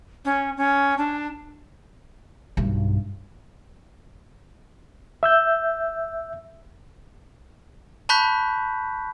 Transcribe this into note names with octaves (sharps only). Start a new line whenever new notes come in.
C#4
C#4
D4
B1 G2
E5 E6 G6
A5 B5 C#6 F#6 G6 B6